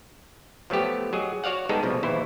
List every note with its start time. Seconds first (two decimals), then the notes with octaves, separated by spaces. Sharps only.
0.70 F3 F#3 A3 B3 G4
1.13 F#3 G#4 D#5
1.44 F#4 C#5 D5 F5 F#5
1.69 G3 G#3 B3 D#4 G#4 A4
1.83 C2 B2 F3
2.03 A#1 D#2 E3 E4 C5